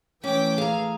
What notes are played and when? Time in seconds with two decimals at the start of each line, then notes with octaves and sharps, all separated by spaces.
0.24 E3 A3 C#4 G5 D6
0.58 G#4 F5 A#5